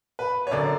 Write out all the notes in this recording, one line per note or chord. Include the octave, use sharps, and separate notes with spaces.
B4
C#5
F#2 D3 D5